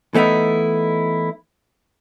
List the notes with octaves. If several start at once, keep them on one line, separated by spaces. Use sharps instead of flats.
E3 A3 B3 D#4 E4